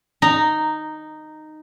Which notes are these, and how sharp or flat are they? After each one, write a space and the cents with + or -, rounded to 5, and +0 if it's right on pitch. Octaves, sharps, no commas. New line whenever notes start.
D#4 -10 A#5 +0